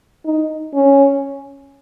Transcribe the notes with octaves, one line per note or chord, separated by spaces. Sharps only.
D#4
C#4